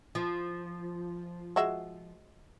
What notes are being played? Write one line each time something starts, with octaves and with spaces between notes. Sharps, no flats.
F3
G#3 F#4 E5